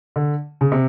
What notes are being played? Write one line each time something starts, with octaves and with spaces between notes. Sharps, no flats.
D3
C#3
C3